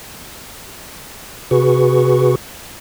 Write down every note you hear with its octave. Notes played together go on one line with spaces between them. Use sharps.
C3 F#4 G#4 B4 C#6